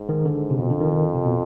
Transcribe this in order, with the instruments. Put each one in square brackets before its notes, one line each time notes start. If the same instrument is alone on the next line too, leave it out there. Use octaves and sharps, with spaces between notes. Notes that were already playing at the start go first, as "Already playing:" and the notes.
Already playing: [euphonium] G#2
[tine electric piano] D#3
D3
C3
[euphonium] F2 [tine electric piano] B2
[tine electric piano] D3
D#3
D#3
C3
B2